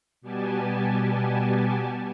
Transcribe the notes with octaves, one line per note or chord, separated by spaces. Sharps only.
B2 G3 B3 G4 G#5 A5